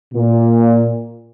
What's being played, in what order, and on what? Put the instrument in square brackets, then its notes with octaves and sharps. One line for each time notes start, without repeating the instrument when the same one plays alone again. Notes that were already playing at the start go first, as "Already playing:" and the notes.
[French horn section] A#2